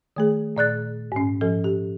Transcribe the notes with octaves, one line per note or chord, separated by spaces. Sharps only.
D#3 A3 G#4
A#2 D5 F#6 A6
G#2 C#4
G#2 F3 C#4 A4
G4